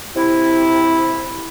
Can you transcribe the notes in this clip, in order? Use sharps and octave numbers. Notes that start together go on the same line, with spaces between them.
C3 E4